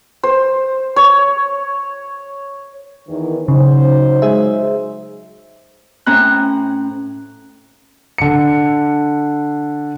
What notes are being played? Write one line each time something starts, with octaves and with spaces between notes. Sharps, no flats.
C5
C#5
E2 D#3
C#3 F#3 D#4 C5
G#3 G#4 E5
A2 C4 C#4 A#5 F#6
D3 C#7